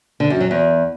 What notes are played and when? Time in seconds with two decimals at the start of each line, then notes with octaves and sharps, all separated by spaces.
0.20 D3
0.30 F#2
0.41 F#3
0.51 E2